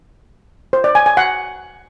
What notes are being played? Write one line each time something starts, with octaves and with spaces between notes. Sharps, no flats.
C5
D5
G#5
G#5
F#5